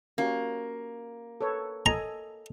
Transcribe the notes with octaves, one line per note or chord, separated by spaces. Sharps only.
A#3 C#4 F#4 G4
A4 B4 C#5
A4 D#5 G#5 A#5